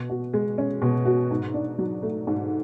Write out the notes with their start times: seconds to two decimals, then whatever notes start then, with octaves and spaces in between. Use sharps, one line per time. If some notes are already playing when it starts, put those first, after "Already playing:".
Already playing: B2
0.10 F#4
0.34 G#3
0.58 C#4
0.82 B2
1.06 F#4
1.31 G#2
1.54 D4
1.78 F#3
2.03 A3
2.27 G#2